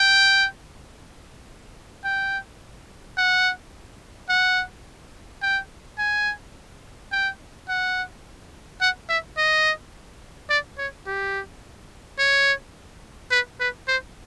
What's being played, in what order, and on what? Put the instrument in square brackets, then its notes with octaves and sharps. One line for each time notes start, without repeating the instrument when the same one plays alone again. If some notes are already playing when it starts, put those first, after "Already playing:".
Already playing: [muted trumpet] G5
G5
F#5
F#5
G5
G#5
G5
F#5
F#5
E5
D#5
D5
C#5
G4
C#5
B4
B4
C5